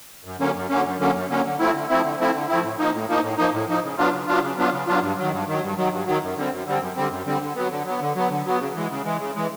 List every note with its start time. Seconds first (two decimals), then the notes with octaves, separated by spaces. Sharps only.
0.25 F#2
0.39 D3 F#3 A#3 C#4
0.55 F#2
0.70 D3 F#3 A#3 C#4
0.85 F#2
0.99 D3 F#3 A#3 C#4
1.15 F#2
1.29 D3 F#3 A#3 C#4
1.44 D3
1.59 F3 A3 C4 E4
1.74 D3
1.89 F3 A3 C4 E4
2.04 D3
2.19 F3 A3 C4 E4
2.34 D3
2.48 F3 A3 C4 E4
2.63 A2
2.79 F3 A#3 D#4
2.94 A2
3.08 F3 A#3 D#4
3.23 A2
3.38 F3 A#3 D#4
3.53 A2
3.68 F3 A#3 D#4
3.83 C#3
3.98 F#3 B3 D4 F4
4.12 C#3
4.27 F#3 B3 D4 F4
4.42 C#3
4.58 F#3 B3 D4 F4
4.72 C#3
4.87 F#3 B3 D4 F4
5.02 G2
5.18 D#3 F#3
5.32 G2
5.48 D#3 F#3
5.62 G2
5.77 D#3 F#3
5.92 G2
6.07 D#3 F#3
6.22 F#2
6.37 D3 G3 C4
6.52 F#2
6.66 D3 G3 C4
6.81 F#2
6.96 D3 G3 C4
7.11 F#2
7.26 D3 G3 C4
7.41 D3
7.56 F#3 B3
7.71 D3
7.86 F#3 B3
8.01 D3
8.16 F#3 B3
8.30 D3
8.46 F#3 B3
8.61 C#3
8.75 E3 G#3
8.90 C#3
9.05 E3 G#3
9.20 C#3
9.35 E3 G#3